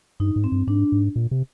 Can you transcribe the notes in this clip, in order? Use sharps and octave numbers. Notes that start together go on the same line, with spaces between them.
G2 D#4
G#2
C4
G2
G#2 D4
G#2
A#2
C3